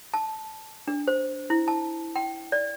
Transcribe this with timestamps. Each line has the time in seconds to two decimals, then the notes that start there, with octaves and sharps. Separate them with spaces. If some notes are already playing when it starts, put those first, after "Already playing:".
0.14 A5
0.88 D4
1.08 C5
1.50 E4
1.68 A5
2.16 G5
2.52 D5